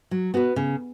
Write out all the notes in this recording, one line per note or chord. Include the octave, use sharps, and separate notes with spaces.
F#3
B3 F#4 B4
C#3